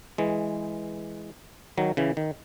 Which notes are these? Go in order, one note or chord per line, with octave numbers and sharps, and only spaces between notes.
E3 G#3
D#3 F#3
C#3 E3
D#3